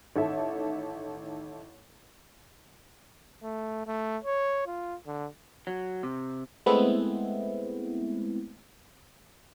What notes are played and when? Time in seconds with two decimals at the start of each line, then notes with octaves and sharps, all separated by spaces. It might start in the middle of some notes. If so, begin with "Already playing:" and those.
0.16 A1 D#3 D#4 A4 E5
3.43 A3
3.87 A3
4.24 C#5
4.67 F4
5.07 D3
5.67 F#3
6.03 C3
6.66 G#3 A3 B3 C4 E4